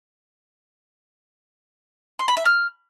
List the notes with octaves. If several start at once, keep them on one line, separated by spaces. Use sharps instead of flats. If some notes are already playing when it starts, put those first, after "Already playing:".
C6
B5
E5
F6